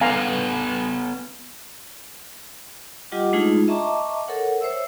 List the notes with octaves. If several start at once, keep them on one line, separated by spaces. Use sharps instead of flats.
B3 A4 B4 F5 G#5 A#5
G3 F4 G4 D#5 F#5 D6
G#3 A3 D4 D#4 F4 G#4
D#5 E5 A5 A#5 C#6 D6
A4 A#4 C#5 F#5
C5 C#5 E5 E6